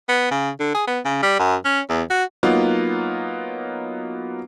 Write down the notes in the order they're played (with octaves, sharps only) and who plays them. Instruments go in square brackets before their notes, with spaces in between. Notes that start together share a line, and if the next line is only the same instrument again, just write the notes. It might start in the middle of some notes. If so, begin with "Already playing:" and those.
[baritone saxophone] B3
C#3
D3
G#4
B3
C#3
G3
F#2
C#4
E2
F#4
[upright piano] F#3 A#3 B3 D#4 F4